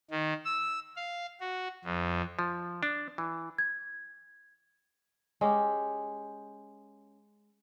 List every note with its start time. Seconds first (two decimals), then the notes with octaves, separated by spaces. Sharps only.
0.11 D#3
0.45 E6
0.96 F5
1.40 F#4
1.84 F2
2.39 F3
2.83 D4
3.18 E3
3.58 G#6
5.41 G#3 C#4 G4